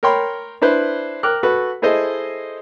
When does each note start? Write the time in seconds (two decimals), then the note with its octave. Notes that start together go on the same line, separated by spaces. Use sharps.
0.03 A#4 C#5 G5 B5 C6
0.62 D4 E4 B4 C5
1.23 A#4 G5 D6 F6 F#6
1.43 F#4 A4 B4
1.82 E4 G#4 A4 C5 D#5